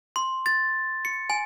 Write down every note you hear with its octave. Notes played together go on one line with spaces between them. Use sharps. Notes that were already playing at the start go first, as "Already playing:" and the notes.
C6
A6
C#7
G#5